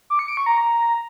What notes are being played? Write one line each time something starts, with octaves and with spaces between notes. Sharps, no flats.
D6
C#7
D7
C#6
A#5